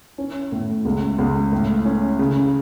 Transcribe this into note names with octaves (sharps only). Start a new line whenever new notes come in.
C#4
A2
C#2
C#2
A2
C#4
C#3